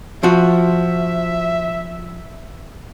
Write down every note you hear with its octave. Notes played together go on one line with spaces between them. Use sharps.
F3 F#4 E5